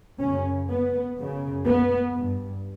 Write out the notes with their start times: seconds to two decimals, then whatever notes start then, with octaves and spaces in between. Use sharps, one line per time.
0.20 F#2 C#3 C#4
0.69 B3
1.18 F#2 C#3
1.66 B3
2.14 G2